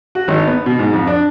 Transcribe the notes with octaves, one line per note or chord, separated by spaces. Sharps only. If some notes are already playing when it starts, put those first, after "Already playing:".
F#4
G#1
B3
B2
G#2
F2
D4